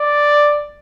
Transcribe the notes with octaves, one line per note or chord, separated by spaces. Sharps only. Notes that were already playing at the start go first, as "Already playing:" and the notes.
Already playing: D5